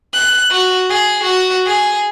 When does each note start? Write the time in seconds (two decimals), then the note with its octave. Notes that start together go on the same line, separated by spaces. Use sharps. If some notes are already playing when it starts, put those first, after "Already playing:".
0.13 F#6
0.50 F#4
0.90 G#4
1.23 F#4
1.66 G#4